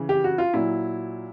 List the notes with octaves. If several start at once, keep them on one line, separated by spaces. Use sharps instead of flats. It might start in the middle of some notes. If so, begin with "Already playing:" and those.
Already playing: C#3 E3
G4
F#4
F4
A#2 F#3 E4